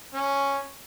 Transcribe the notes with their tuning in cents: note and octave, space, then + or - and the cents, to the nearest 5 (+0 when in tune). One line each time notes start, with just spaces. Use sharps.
C#4 +0